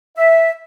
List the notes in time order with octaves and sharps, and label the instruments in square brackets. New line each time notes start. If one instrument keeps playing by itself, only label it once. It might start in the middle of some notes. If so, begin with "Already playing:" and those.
[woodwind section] E5